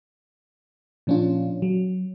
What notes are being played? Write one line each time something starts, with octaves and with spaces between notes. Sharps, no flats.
A#2 F3 C#4 D4 F4
F#3